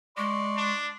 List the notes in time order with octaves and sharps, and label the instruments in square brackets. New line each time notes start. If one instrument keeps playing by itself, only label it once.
[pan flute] G#3 [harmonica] D5 C6 C#6
[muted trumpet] D4